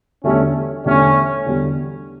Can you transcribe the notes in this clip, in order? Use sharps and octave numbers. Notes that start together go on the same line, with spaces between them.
E2 D3 G3 A3 C#4 D4 G4
E2 D3 G3 A3 C#4 D4 G4
E2 D3 G3